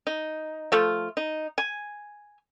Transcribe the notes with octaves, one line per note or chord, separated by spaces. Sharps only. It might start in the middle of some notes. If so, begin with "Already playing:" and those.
D#4
F3 A3 F4
D#4
G#5